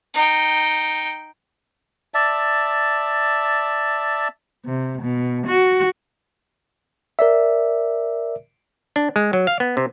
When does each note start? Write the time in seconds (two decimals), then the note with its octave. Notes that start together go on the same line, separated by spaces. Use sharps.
0.14 D#4 G5
2.14 D5 E5 A5
4.66 C3
5.02 B2
5.47 F#4
7.19 A#4 D5 E5
8.96 D4
9.16 G#3
9.33 F#3
9.47 F5
9.60 B3
9.77 C3